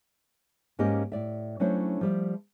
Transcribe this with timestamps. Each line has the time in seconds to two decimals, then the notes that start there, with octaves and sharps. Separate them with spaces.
0.79 G#2 A#3 C#4 G4 D#5
1.12 A2 D5 E5
1.60 F#3 A3 C#4 D4 E4 C5
2.01 F3 G3 E5